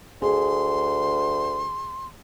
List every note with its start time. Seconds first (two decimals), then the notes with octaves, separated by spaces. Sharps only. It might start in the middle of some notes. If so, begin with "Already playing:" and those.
0.22 D2 G#4 C6